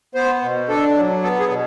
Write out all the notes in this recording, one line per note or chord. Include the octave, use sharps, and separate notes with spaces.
B3 C5
B2
D4 A4
F#3
B3 A4
G#4
B2